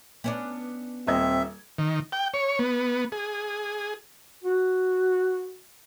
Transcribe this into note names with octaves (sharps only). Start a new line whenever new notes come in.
B3 C#4 D4
D#1 C4 D#5 E5 G#6
D#3
G5
C#5
B3
G#4
F#4